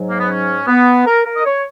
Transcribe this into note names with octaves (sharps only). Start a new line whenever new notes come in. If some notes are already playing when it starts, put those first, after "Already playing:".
Already playing: G#2 F#3
A#3
B3
C#4
B3
A#4
A#4
D#5
C#5